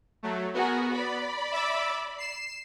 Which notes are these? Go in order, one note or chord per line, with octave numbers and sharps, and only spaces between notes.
F#3 A3
B3 F#4 G#4 A#4
D5 B5
E5 D6 E6
C7 E7